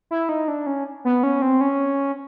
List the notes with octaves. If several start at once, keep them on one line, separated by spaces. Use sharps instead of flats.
E4
D#4
D4
C#4
B3
C#4
C4
C#4